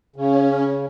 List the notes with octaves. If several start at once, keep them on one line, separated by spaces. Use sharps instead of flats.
C#3 C#4